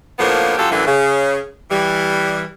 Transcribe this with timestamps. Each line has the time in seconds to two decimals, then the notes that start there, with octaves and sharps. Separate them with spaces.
0.19 A2 F3 A#3 B3 D4
0.58 F#3 C#4 F4 G4 A4
0.71 F#2 A2 D3 E3
0.87 C#3
1.71 E3 G3